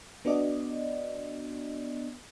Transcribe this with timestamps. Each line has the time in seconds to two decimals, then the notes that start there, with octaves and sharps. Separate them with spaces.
0.25 B3 D4 F#4 D5 D#5